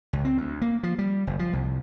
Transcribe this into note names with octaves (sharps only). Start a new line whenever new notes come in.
C#2
C4
D2
A#3
F3
G3
F#1
F3
C2